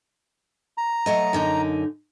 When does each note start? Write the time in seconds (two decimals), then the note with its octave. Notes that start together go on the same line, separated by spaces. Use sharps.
0.78 A#5
1.06 F#3 A3 D#5
1.33 F#2 D3 D#4